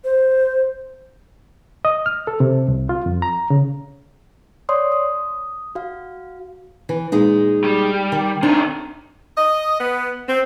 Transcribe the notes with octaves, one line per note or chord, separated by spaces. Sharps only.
C5
D#5
F6
A4
C3
C2
F4
F2
A#5
C#3
C#5 D5 C6 D#6
D#6
F#4 F5
E3
A#2 G#3 D#4
G3
D#3
C3 D#3 D4
D#5
B3
C4